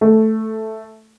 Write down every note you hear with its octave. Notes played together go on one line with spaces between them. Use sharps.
A3